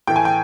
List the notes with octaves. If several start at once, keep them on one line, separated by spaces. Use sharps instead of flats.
A2 E3 A3 G5
G#5
G5